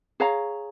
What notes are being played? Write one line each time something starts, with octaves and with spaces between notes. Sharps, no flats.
G#4 C#5 F5 A#5